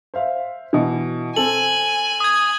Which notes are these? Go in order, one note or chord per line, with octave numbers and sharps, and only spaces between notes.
C5 E5 F5
B2 E3
C4 A4 G#5 F#7
D#6 G#6